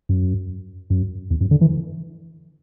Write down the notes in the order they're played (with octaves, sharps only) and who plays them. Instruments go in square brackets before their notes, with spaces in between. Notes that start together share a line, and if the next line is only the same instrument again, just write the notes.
[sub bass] F#2
F#2
E2
F#2
D3
E3